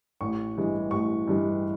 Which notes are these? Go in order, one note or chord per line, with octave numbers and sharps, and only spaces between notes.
A1 C#6
G2 E3 G#3
A1 C#6
G2 E3 G#3